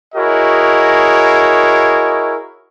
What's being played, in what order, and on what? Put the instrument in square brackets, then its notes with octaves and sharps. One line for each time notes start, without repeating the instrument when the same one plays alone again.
[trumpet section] E4 F#4 G#4 A#4 C#5 D#5